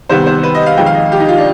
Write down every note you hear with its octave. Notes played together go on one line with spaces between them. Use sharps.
C3 D#3 G3 B3 C5
C5
B4
D#5
F5
F2 D#3 G#3 G5
F5
D#5
G4
D#4
F4
D4